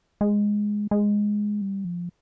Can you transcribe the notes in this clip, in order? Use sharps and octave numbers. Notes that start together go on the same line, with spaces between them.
G#3
G#3
G3
F3